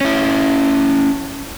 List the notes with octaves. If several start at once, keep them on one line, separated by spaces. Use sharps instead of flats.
C#4 E4